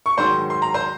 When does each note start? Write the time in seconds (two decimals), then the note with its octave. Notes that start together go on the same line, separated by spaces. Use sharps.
0.06 C#6
0.17 G#2 D#3 F#3 C5 C6
0.50 C6
0.62 A#5
0.74 C5 C6